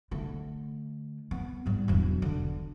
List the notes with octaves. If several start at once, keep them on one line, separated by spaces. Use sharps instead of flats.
D3 A3
B3
G#2 G3
E1 F#2
D3